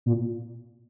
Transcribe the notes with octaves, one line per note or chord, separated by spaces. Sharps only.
A#2